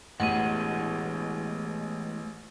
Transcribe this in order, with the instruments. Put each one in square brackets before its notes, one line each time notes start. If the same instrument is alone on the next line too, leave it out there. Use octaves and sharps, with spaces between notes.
[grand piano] A1 [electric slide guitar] E3 G#3 B3 [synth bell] F#5 D#7